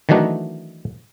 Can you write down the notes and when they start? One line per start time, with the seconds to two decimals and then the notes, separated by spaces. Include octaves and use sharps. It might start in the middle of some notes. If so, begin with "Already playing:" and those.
0.09 D#3 E3 F#3 A3 D4 D#4